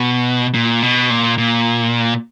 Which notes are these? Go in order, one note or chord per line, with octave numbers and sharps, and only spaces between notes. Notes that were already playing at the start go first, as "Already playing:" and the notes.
Already playing: B2
A#2
B2
A#2
A#2